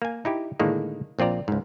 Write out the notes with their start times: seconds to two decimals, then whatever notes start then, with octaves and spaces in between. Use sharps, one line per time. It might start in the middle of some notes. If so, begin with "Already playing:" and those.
0.02 A#3 G#5
0.25 D#4 E4 G4
0.60 A2 D3 D#3 G#3 A#3
1.19 A#1 C4 F4 D5 A#5
1.48 C#2 G#2